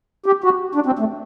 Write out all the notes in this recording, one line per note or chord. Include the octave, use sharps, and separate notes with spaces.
G4
F#4
D4
C4
A3